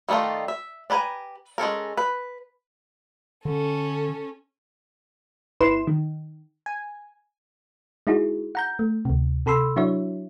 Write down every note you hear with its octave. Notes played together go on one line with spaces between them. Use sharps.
D#3 G3 A3 D#4 F4
E5
D4 G4 B4 G#5 A#5
G#3 C#4 A4 A#4
B4
D3 C#4 A4
G1 E4 B4 C6 E7
D#3
G#5
G#3 D#4 E4 F#4 G#4
F#5 A#5 G6
A3
D2 C3
C3 A4 B5 C6 E6
F#3 D4 E4 F#4 C#5 E5